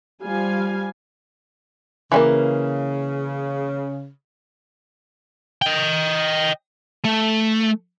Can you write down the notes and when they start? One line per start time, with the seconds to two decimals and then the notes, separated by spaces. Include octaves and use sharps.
0.24 F3 G3 F5 G#5
2.12 C#3 E3 G3 A#3
5.62 D#5 G5
7.04 A3